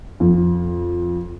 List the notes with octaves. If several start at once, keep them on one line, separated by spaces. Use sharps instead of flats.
F2